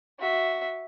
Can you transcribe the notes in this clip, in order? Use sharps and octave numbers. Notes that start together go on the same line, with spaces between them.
F#4 E5